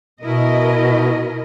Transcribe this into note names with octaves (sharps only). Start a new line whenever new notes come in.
B2 E4 A#4 D#5